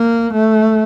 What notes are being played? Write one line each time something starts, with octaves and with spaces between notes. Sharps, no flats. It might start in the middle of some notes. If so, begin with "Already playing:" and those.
Already playing: A#3
A3